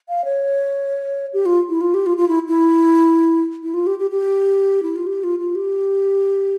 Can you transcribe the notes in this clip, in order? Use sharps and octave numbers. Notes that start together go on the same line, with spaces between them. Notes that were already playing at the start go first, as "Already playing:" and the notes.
F5
C#5
G4
F4
E4
F4
G4
F4
F4
E4
E4
E4
F4
G4
G4
G4
E4
F4
G4
F4
F4
G4